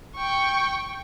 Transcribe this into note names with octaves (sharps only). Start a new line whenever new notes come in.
G5 C#6